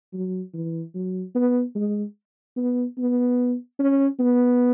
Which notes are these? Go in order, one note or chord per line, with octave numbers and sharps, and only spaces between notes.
F#3
E3
F#3
B3
G#3
B3
B3
C#4
B3